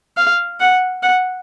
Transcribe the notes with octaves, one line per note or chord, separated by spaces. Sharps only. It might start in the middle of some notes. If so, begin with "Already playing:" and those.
F5
F#5
F#5